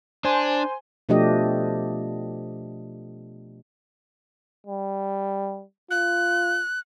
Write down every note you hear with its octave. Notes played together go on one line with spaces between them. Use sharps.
D4 C5 G#5 C6
B2 F3 A3 D4 G4 D#5
G3
F4 F#6